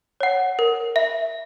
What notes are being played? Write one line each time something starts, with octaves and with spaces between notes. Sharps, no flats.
C#5 F#5
A#4
E5